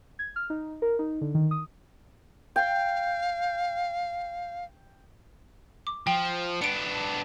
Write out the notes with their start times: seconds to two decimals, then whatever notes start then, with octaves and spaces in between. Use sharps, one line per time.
0.19 G#6
0.36 F6
0.50 D#4
0.82 A#4
0.99 D#4
1.21 D3
1.35 D#3
1.51 D#6
2.56 F5 G5
5.87 D6
6.07 F3 G5
6.25 G7
6.62 B3 D4 C#7 D7